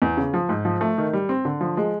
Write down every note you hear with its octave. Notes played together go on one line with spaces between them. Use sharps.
E2
C#3
F3
G#2
F3
A3
D#3
G3
C4
D3
F3
G#3